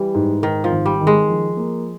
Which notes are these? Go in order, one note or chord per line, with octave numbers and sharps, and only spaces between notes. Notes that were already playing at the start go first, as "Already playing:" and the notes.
Already playing: E3 G3
G#2
G#2 D#3
F3
G#1
G3
D#3
G#3
F3
A#3